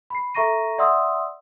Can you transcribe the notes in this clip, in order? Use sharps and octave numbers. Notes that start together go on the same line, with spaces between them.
B5 C7
A4 E5 A#5 C#6 A#6 D#7
D5 E5 F#5 C6 D#6 E6